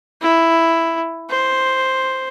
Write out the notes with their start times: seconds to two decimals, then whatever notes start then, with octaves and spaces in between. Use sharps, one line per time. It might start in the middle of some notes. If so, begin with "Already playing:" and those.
0.22 E4
1.30 C5